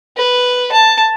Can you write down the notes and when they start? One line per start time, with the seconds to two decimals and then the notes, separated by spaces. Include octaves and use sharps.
0.17 B4
0.72 A5